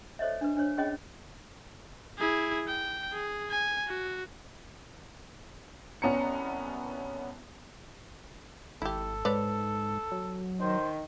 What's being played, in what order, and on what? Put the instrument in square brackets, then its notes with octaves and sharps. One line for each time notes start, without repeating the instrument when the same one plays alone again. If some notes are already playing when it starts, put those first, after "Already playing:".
[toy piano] A4 C5 C#5 D#5 E5
D4 B4
D4 C5 C#5
C#4 G#4 C#5 D#5 G5 B5
[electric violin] E4 G#4
G5
G#4
G#5
F#4
[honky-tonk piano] C2 B3 C#4 A#5 C#7
[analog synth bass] G#1 [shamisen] E4 G4 [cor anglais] A4
[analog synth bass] G#2 [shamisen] B4 C#5 D5
[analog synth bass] F#3
[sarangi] D#3 [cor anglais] C5